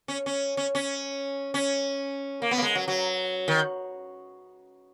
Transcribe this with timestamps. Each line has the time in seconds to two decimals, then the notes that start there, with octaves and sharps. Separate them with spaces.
0.08 C#4
0.26 C#4
0.57 C#4
0.75 C#4
1.54 C#4
2.42 A#3
2.51 B3
2.58 A#3
2.62 G#3
2.75 F#3
2.88 F#3
3.48 D#3